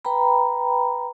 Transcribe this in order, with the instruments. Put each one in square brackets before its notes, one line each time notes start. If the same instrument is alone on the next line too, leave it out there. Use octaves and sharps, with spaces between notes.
[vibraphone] B4 G5 A#5 B5